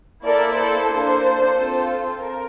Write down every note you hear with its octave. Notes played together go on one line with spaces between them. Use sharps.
A#3 E4 A4 A#4 D5
A4 C5
A#3 D4 A4
C4 F4 A4
A#4